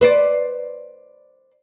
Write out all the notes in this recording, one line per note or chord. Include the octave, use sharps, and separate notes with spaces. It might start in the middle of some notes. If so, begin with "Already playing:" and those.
B4 C5 D5